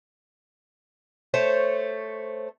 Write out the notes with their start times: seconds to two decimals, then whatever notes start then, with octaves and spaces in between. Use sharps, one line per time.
1.34 A3 C5 C#5 A5